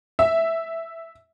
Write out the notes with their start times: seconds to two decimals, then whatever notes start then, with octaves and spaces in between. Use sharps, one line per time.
0.19 E5